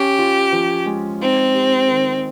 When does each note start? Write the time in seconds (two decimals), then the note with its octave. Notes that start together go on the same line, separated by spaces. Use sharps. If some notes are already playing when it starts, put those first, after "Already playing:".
Already playing: C#4 G4
0.19 F4
0.52 F3
0.86 G#3
1.20 C4 D#4
1.55 G4
1.88 D#3